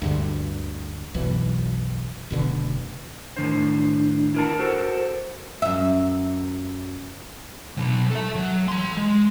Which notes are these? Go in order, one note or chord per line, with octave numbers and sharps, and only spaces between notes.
D2 G2 D3
F#1 B1 B2 E3
F1 B2 D3
A2 D#3 D4 C5
E4 A#4 A5
F#4 A4 A#4 C5
F#2 E5
B2 F#3
A4 E5
F#3
A4 C6
G#3